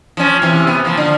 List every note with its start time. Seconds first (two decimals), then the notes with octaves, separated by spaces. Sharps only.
0.17 F3 C#4
0.42 C3 E3
0.67 B3
0.85 F3 A#3
0.97 D3 F3